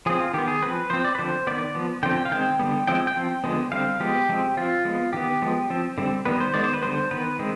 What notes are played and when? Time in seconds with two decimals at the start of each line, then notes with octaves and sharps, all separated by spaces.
0.06 F3 C4 G#4
0.20 F4
0.34 D#3 B3 G4
0.48 G#4
0.62 F3 C4 B4
0.90 F3 C4 C5
1.04 D5
1.15 B4
1.19 D3 F3 C4 C5
1.47 D#3 B3 D5
1.75 F3 B3
2.03 D3 F3 C4 G5
2.18 G5
2.25 F5
2.31 D#3 G#3 C4 G5
2.59 D3 G3 B3
2.87 F3 G#3 C4 G5
3.07 G5
3.16 F3 C4
3.44 D3 F3 G#3 B3
3.72 D3 G3 C4 F5
4.00 F3 G#3 B3 G4
4.29 F3 G#3 C4
4.57 F3 C4 F4
4.85 F3 G#3 B3
5.13 D#3 B3 G4
5.42 F3 G#3 B3
5.70 F3 C4
5.98 D3 G3 C4
6.25 D#3 G3 B3 B4
6.40 C5
6.54 D#3 G#3 B3 D5
6.64 C5
6.74 B4
6.82 D3 G3 B3 C5
7.11 D#3 B3 B4
7.39 D#3 G#3 C4